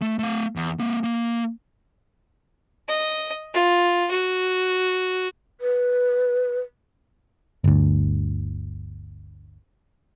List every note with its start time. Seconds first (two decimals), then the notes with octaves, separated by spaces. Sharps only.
0.02 A3
0.19 A3 F5
0.56 E2
0.79 A#3 C4
1.04 A#3
2.88 D#5
3.54 F4
4.11 F#4
5.61 B4
7.64 G1 D2